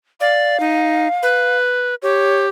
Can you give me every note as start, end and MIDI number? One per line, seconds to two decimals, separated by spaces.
0.20 0.59 74
0.20 1.57 77
0.60 1.08 63
1.22 1.95 71
2.02 2.49 67
2.02 2.45 73